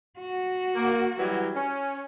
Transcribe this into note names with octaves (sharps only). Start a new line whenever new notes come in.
F#4
A#3
E3 F#3 G3
C#4